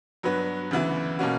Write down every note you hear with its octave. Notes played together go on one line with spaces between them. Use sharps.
G2 F#3 B3 F#4 B4
D2 C#3 E3 B3 E4
B2 A#3 C#4 F#4